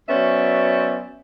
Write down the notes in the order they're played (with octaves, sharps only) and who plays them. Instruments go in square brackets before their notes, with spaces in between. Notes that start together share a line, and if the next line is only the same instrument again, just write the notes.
[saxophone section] F#3 B3 C#4 C5 D5 E5